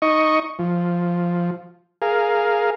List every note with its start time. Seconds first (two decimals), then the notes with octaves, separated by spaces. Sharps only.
0.02 D#4 D#5 C#6
0.59 F3
2.02 G#4 A#4 F5